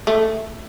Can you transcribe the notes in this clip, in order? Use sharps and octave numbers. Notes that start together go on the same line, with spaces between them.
A3